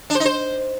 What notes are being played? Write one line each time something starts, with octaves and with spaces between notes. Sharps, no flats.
D4
C5
D#4
C5